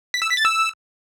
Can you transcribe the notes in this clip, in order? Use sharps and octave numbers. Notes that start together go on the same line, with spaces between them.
B6
E6
B6
A6
E6